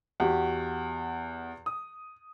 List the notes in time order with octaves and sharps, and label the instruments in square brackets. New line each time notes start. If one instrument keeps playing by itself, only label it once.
[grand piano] E2 [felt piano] F#4 G4 F#5
[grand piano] D#6